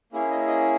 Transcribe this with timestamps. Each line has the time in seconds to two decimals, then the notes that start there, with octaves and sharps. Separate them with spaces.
0.12 A#3 C#4 E4 G#4
0.30 D#5
0.47 D#5